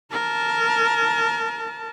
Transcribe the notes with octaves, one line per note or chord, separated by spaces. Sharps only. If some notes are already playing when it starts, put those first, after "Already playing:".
A#4 A5